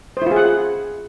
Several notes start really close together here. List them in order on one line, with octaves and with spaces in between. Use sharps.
C5 E4 F4 G#4 F#5